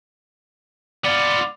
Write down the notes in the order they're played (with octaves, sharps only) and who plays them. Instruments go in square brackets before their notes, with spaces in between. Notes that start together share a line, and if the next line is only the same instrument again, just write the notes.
[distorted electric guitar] B3 F4 [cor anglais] D5